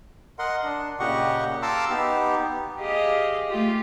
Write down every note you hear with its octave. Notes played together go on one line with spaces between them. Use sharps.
A#4 D#5 F#5 C6
D4
A#2 C#3 G4 D#5 F#5 C#6
F5 A5 A#5 C6 D6 E6
B3 D#4 G4
G4 G#4 D#5 F5
A3 F4 G4